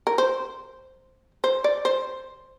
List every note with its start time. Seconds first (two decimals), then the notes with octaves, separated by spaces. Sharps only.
0.07 A#4
0.18 C5
1.44 C5
1.64 D5
1.85 C5